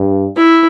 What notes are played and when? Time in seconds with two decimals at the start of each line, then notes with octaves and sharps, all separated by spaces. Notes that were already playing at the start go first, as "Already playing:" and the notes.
Already playing: G2
0.37 E4